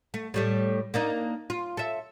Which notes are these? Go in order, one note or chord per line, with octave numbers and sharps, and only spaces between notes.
A3
A2 G3 A3
A#3 D4 D#4
F4
A4 E5